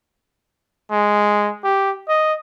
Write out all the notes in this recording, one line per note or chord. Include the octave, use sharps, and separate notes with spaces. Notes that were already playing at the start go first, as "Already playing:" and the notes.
G#3
G4
D#5